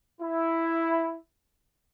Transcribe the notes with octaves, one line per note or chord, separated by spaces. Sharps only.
E4